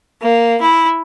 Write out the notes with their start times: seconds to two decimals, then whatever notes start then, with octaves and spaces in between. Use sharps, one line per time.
0.21 A#3
0.61 E4